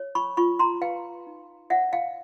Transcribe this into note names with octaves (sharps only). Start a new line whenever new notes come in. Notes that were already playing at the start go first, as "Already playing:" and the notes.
Already playing: C#5
B5 C#6
F4 B5 C#6
A#5 C6
B4 F5 G5
D#4
C#5 E5 F#5
F5 G5